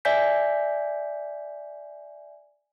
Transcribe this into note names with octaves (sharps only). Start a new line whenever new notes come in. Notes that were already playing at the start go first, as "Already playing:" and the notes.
D5 E5 G#5 G6 B6